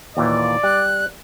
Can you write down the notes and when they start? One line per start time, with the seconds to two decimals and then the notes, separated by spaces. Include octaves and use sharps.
0.17 D#2 A#2 E3 D5
0.63 G3 F#6